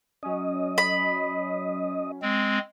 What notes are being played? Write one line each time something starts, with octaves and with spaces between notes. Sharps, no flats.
F#3 C#4 D#5
B5
G#3 C4